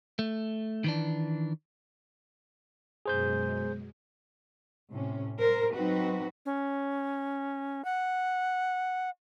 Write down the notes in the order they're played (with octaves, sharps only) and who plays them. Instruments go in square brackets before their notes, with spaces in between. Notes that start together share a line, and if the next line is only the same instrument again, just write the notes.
[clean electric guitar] A3
D#3 E3 D4
[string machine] F#2 B2 G#3 [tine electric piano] G#4 C5 G6
[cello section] A2 C3 C#4
A#4 C5
F#3 C4 D#4 F#4 B4
[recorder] C#4
F#5